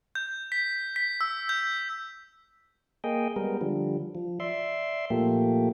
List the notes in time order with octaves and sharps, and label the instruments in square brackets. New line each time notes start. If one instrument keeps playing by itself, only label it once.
[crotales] G6
B6
B6
E6
G6
[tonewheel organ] A#3 G#4 D#5 G5
G3 G#3 B3 A#4
D3 F3 G3
F3
D5 E5 C6
A#2 F3 A3 A#3 G4